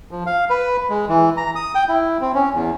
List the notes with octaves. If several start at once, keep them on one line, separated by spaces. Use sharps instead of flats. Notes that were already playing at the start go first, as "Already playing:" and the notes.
F3
F5
B4
G#3
E3
A#5
D#6
G5
E4
C4
C#4
E2